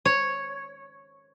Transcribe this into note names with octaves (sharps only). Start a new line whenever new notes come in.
C#5